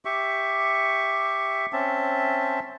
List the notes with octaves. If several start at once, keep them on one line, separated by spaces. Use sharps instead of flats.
G4 E5 C#6
C4 C#4 E5 A5